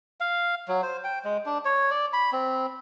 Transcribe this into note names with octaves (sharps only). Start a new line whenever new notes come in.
F5
F#3
C5
G5
G#3
D4
C#5
D5
B5
C4